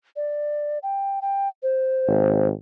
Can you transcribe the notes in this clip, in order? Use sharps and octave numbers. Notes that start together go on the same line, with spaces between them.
D5
G5
G5
C5
G#1